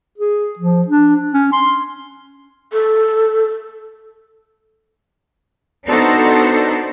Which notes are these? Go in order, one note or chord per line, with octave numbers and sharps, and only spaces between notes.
G#4
F3
D4
C#4
C6
A4
B3 D4 D#4 F#4 A4 C5